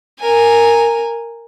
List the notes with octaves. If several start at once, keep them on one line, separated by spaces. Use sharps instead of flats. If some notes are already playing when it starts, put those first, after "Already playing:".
A#4 G#5